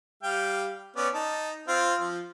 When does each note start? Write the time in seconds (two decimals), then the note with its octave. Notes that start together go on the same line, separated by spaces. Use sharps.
0.23 G3 F5 G5
0.96 B3 C#4 D5
1.14 D#4 A5
1.68 C4 F4
2.00 F3 F4